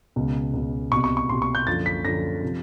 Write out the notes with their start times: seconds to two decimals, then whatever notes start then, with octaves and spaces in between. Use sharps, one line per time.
0.16 C#2 B2
0.54 C#2 B2
0.92 C2 B2 C#6
1.04 C#6
1.17 C#6
1.29 C2 B2 C6
1.42 C#6
1.55 G6
1.67 F#2 D3 F3 A6
1.86 B6
2.05 F#2 D3 F3 A#6
2.43 C3 F3